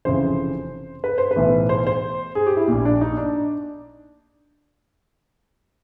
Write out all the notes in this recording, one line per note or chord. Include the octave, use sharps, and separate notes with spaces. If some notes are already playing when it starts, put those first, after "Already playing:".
F1 F2 C#3 E3 C5
B4
C5
B4
B1 A2 E3
C5
C5
G#4
G4
E4
A#1 A#2
D4
D#4
D4